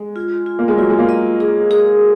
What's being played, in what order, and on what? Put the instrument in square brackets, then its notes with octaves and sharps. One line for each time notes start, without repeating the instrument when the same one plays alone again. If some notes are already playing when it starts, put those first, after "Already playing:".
Already playing: [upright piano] G#3
[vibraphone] F4
F4
[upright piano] A#3
G#3
[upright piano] F#3 [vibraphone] F4
[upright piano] G#3
A#3
[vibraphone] D#5
G#4
G#4